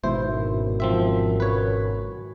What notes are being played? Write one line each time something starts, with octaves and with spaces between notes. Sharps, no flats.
G#1 G#2 B2 E4 C5
F#2
F3 C4 E5
B4 C#5